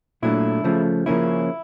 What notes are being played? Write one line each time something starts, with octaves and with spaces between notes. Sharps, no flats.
A#2 F#3 A3 D4 E4
C#3 F3 A3
C#3 F3 A#3 C#4 E4